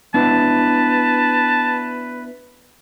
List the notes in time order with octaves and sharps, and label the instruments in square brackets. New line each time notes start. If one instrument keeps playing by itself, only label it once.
[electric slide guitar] B3 D4 E4 [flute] B4 [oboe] A5